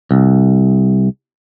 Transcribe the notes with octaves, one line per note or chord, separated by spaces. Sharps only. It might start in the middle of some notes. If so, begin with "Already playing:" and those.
C2